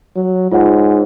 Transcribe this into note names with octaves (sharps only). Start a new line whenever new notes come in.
F#3
G#2 F4 C#5 F#5